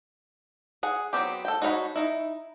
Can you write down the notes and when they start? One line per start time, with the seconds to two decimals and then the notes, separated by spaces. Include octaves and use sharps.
0.83 G#4 F#5
1.13 F#3 B3 C4 G4
1.45 A4 G5
1.62 D#4 F#4 C#5 F5 B5
1.96 D#4 E4